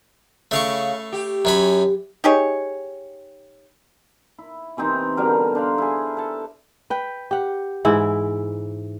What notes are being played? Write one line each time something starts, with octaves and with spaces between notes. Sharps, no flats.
C#3 A3 F5 C#6
G4
F#2 C#4 B5
D#4 G4 G#4 C#5
E4
C3 E3 C4 D#4
B2 D3 G3 A#4
D4 C5 F5
E4 G#4
A4 A5
B4 G5
G4 F#5
G#2 E3 E4